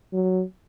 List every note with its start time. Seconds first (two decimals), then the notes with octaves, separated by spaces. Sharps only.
0.13 F#3